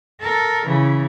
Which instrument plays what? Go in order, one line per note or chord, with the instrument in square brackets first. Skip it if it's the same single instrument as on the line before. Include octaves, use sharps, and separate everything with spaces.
[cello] A4 A#4
C#3 E3